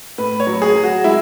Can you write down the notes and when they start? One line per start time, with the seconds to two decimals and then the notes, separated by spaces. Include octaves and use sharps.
0.18 A2 B4
0.40 C#5
0.47 F#3
0.62 G#4
0.75 F#3
0.84 F#4
1.04 G#3 E4